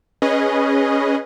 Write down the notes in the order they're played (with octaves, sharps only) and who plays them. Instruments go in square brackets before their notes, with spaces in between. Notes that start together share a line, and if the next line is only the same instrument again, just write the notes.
[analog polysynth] C#4 G#4 B4 D#5